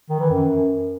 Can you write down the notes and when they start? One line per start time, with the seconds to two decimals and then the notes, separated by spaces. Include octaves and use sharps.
0.09 D#3
0.20 E3
0.30 F#2